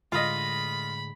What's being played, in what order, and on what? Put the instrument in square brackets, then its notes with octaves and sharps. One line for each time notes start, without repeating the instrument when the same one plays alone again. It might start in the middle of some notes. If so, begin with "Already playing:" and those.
[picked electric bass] A2 D3 G#3 [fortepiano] F4 D#5 [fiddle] B5